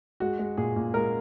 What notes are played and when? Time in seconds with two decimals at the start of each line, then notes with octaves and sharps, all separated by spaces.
0.20 G#3 F#4
0.39 G#3
0.57 A#2 G#4
0.76 A#2
0.94 G#3 A#4